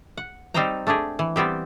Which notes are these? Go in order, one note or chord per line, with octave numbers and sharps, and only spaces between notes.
F#5
G3 C4 D#4 C5 G5 A#5
A3 D4 G4 G#4
E3
G3 B3 C4 G4